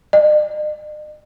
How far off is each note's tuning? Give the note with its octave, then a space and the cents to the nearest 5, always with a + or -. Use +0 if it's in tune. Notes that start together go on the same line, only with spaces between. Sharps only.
D#5 -45